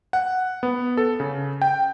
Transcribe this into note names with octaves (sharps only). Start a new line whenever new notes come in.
F#5
B3
A4
C#3
G5